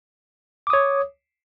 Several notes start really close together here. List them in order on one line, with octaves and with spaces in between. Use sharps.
D6 D#6 C#5